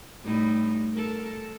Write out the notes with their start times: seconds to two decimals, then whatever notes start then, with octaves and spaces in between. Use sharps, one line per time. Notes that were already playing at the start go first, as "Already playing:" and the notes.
0.24 A2 G3 D#4
0.93 A4 A#4